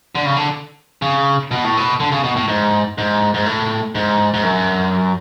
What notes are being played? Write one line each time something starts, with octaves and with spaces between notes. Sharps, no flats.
D3
C#3
D3
C#3
B2
A2
B2
D3
C#3
B2
A2
G#2
G#2
G#2
A2
G#2
G#2
F#2